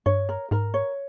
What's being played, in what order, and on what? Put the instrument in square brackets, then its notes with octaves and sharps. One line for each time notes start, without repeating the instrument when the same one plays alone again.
[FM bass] G2 [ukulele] C#5
[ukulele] A#4
[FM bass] G#2 [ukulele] A#4
[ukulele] C#5